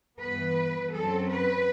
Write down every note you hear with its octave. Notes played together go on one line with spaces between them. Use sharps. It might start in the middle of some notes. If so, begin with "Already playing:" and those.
G2 E3 B3 B4
F#2 F#3 C4 A4
B4